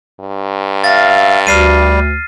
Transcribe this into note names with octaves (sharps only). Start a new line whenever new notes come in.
G2
E5 F5 A6 A#6
D2 G3 F6 C7 D#7